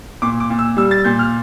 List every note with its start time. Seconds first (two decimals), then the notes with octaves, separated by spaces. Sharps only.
0.22 A#2 D6
0.40 D6
0.50 A#2
0.59 E6
0.77 G3 E6
0.91 A6
1.04 A#2 G6
1.19 F6